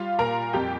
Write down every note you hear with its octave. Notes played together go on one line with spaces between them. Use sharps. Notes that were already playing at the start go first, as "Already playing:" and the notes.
Already playing: G3 F4 F5
A#2 A#4 A#5
F2 G4 G5